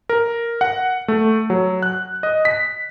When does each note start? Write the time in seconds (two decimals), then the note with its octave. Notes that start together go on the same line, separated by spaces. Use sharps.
0.09 A#4
0.61 F#5
1.08 A3
1.50 F#3
1.83 F#6
2.23 D#5
2.45 B6